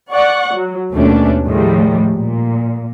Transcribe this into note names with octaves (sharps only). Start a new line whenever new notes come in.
D5 F#5 C#6
F#3
D#2 B2 A3 C#4 D4
A2 D#3 F3 G3 G#3
A#2